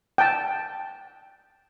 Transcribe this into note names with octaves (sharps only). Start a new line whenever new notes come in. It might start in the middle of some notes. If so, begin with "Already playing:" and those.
G5 A5